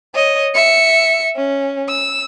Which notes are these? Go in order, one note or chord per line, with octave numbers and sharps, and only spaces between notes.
C#5 D#5
E5 C#7
C#4
E6